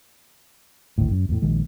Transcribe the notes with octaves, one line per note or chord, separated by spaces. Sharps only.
G#1 D2 A2
F#2
E2 A2
A#1 D#3 G#3